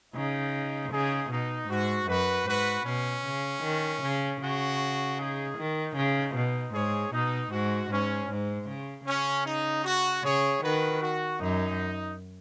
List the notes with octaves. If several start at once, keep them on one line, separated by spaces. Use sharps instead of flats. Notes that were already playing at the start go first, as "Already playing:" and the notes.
C#3 D#4
C#3 D#4 G#4
B2 D#4
G#2 F#4
F#2 F#4 B4
G#2 F#4 B4
B2 C#4
C#3
D#3
C#3
C#3 F#4
D#4 G#4
D#3 D#4
C#3
B2
G#2 G#4 C#5
B2 D#4
G#2 F#4
G#2 C#4
G#2
C#3
C#3 C#4
D#4
F#4
C#3 G#4 C#5
D#3 F#4 B4
F#4
F#2 D#4